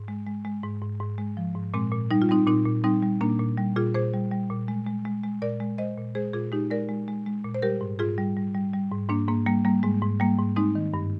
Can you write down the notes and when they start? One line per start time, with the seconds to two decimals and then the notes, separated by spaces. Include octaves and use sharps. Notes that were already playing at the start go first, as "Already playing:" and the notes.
Already playing: G#2
0.08 G#3
0.27 G#3
0.45 G#3
0.64 G#2
0.82 G#2
1.00 G#2
1.18 G#3
1.37 F3
1.55 G#2
1.74 A#2 G#3 C4
1.92 A#2
2.11 G3 D#4
2.22 F4
2.29 G3 C4 D#4
2.47 A#2 C4 D#4
2.66 A#2
2.84 G3 C4 D#4
3.03 G3
3.21 A#2 A#3 D4
3.39 A#2
3.58 G3
3.76 A#2 F4 G#4
3.94 A#2 G#4 C5
4.13 G3
4.31 G3
4.50 A#2
4.68 G#3
4.87 G#3
5.05 G#3
5.23 G#3
5.42 A#2 A#4 D5
5.60 G#3
5.78 G#3 C5 D#5
5.97 A#2
6.15 G#3 G#4 C5
6.33 A#2 F4 G#4
6.52 G#3 D#4 G4
6.70 G#3 A#4 D5
6.89 G#3
7.08 G#3
7.26 G#3
7.44 A#2
7.55 C5
7.62 G3 G4 A#4
7.81 G#2
7.99 G#2 F4 G#4
8.18 G3
8.37 G3
8.55 G3
8.73 G3
8.92 G#2
9.09 G#2 A#3 D4
9.28 G#2 A#3
9.47 G3 A#3
9.65 G3 A#3
9.83 G#2 G#3
10.02 G#2
10.20 G3 A#3
10.39 G#2
10.56 G#3 C4 D#4
10.75 D#3
10.94 G2